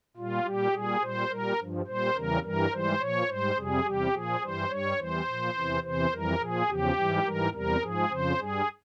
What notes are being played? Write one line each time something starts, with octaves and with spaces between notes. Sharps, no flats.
A#2 G3 F4
A#2 G3 G4
A#2 G3 G#4
A#2 G3 C5
A#2 G3 A#4
G2 F3
A#2 G3 C5
E2 C#3 E3 G3 A#4
G2 E3 G3 A#4
G#2 E3 G3 C5
A#2 F3 C#5
G#2 G3 C5
F2 C3 G3 G#4
E2 C3 G3 G4
A#2 F3 G#4
G2 E3 G3 C5
G2 G3 C#5
E2 E3 G3 C5
A#2 F3
E2 C3 E3
E2 C3 E3 C5
F2 E3 G3 A#4
A#2 F3 G#4
E2 C#3 F3 G4
G#2 E3 G3
G#2 E3 G3 A#4
E2 C3 G3 A#4
G#2 F3 G#4
F2 C#3 F3 C5
G2 G3 G#4